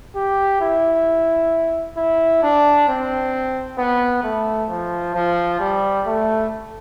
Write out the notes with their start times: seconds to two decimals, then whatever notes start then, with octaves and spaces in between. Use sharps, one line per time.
0.16 G4
0.61 E4
1.97 E4
2.43 D4
2.88 C4
3.78 B3
4.23 A3
4.69 F3
5.15 F3
5.60 G3
6.06 A3